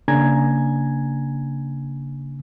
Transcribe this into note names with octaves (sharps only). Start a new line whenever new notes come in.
C#3 A#3 D4 G#5 A#5 G#6